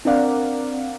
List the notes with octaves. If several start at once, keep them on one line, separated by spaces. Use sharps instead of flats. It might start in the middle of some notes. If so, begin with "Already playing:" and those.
C4 D4 A#4 D5 F5 F#5